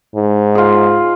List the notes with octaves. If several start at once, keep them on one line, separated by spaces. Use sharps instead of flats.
G#2
F4 G#4